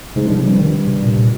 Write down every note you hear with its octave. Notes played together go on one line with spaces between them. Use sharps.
G#2 C3
G2 F3
F2
G2 G3
D#3
C3
A#2
A#2